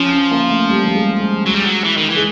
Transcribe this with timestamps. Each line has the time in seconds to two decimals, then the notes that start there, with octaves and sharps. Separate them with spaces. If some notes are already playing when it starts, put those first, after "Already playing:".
Already playing: F3 C#4
0.13 C#4
0.31 A#3
0.50 A3
0.70 G3
0.85 G3
0.95 G#3
1.20 G#3
1.46 F#3
1.55 G3
1.65 F#3
1.84 E3
1.97 D#3
2.10 E3
2.16 G#3